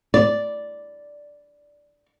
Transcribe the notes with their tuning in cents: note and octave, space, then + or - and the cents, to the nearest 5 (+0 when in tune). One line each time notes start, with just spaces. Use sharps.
D5 -5